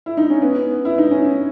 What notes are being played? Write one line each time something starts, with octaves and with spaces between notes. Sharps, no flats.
E4
D#4
C#4
B3
E4
D#4
C#4